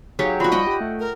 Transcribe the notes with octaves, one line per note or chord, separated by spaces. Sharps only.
F#3 D#4 G4 G#4 C#5 F5
F3 F4 F#4 D5 B5
G3 D#5 F#5 G5
G4
A3
A#4